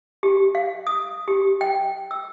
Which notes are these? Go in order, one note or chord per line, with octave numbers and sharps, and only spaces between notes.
G4
F5
D#6
G4
G5
E6